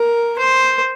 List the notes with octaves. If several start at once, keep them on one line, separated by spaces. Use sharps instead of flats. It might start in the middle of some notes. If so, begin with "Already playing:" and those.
Already playing: A#4
C5